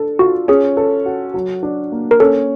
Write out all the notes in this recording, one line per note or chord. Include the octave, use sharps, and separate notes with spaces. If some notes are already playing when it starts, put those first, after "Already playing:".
Already playing: D4 A4
F4 F#4
C#4 G#4
A4
F#4
F#3
D4
A#3
A#4
C#4 A4